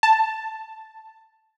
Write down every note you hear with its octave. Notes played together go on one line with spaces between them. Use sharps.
A5